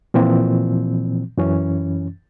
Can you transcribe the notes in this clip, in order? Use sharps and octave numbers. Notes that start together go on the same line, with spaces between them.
A#2 E3 F3 C4
F#2 E3 C#4